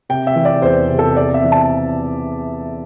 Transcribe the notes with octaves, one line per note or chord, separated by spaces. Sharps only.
C3 G5
E5
E3
D5
E2 C5
C3
A4
C4 D5
E5
E3
A5